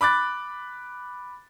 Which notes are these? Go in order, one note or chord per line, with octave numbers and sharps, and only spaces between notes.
B5 D6 F#6 A6